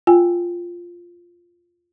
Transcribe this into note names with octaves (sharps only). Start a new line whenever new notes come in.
F4 G5 G#5